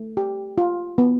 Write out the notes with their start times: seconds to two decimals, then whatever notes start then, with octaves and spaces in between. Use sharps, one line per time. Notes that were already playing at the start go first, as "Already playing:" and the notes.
Already playing: A3
0.17 G4
0.58 F4
0.98 B3